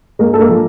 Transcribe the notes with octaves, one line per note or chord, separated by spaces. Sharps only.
G#3 A#3 A#4
A4
A#3 A#4
F3